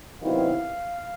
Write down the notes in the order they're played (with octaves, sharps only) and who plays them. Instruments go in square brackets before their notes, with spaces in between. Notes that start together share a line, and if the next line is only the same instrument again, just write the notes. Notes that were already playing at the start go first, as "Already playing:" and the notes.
[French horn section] C3 D#3 F#3 B3 E4 [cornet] F5